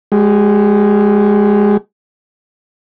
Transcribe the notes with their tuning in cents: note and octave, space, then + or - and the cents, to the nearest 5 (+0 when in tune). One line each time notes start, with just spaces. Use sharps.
G#3 +0 G4 -35